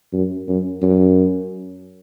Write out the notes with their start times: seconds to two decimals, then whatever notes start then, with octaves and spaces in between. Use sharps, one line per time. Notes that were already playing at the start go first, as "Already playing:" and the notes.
0.13 F#2
0.48 F#2
0.82 F#2